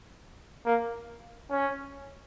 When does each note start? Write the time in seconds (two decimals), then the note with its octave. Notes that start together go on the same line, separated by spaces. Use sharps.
0.66 A#3
1.51 C#4